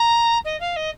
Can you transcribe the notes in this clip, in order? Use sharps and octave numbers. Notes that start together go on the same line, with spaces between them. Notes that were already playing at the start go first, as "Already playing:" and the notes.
Already playing: A#5
D#5
F5
D#5